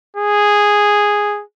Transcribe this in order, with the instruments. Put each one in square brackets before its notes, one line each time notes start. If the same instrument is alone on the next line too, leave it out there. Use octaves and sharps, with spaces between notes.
[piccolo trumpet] G#4